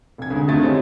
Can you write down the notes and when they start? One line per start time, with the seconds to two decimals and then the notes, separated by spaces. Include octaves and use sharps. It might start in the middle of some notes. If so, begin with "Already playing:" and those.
0.18 F1 G#6
0.30 D2 G#3
0.48 F2 D3 D#3 A3 A6
0.62 G3 C4 C#4 D#4 E4